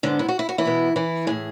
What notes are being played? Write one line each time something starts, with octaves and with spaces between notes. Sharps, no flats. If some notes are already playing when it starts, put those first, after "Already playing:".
G#2 D3 G#3 B3 D4
E4
F#4
E4
F#4
E3 E4
B2 G#3 B3
E3 E4
A2 E3 G#3 A3 G#4